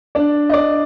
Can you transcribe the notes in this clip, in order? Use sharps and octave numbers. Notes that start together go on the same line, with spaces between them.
D4 D5
D#5
D4 D5